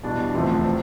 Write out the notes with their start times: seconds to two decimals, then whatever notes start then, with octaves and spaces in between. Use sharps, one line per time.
0.03 E2 B2 G3 D4
0.34 E1 D2 C3 F3 A3
0.65 F3